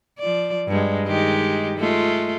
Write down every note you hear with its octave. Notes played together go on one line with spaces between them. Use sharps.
F3 D5
G2 G#3
D#3 G#3 G4
G#3 A3 F4